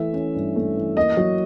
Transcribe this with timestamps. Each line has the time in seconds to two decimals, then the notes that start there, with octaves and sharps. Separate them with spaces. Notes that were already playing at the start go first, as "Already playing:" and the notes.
Already playing: E3 A3 E5
0.13 C#4
0.35 G2
0.56 A3
0.76 E3
0.96 A#3 D#5
1.17 F#3